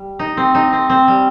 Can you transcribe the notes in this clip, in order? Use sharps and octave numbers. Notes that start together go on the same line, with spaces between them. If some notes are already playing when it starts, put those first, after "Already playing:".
Already playing: G3
D#4
C4
D#4
C4
C4
G3